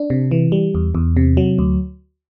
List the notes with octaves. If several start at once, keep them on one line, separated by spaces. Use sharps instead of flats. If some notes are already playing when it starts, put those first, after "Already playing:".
Already playing: D4
C3
E3
G3
E2
E2
C3
F#3
D2